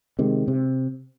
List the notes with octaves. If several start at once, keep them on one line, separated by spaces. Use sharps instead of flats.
C3 D#3 G#3
C3